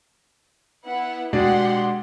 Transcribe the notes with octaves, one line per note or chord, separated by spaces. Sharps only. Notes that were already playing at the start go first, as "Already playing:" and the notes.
B3 E4 F#5
B2 G#3 D4 G4 F#5 C6